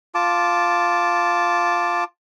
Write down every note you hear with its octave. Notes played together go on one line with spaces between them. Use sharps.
F4 A5 D6